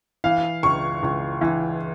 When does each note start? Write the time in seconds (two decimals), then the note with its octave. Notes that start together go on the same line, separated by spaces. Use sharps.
0.24 E3 F5
0.63 C#2 C#6
1.03 C#2
1.41 E3